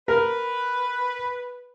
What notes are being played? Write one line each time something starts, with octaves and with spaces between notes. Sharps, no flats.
A#4 B4